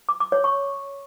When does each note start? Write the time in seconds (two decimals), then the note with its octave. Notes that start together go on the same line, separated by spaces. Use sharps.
0.09 D6
0.20 D6
0.32 C#5
0.44 C#6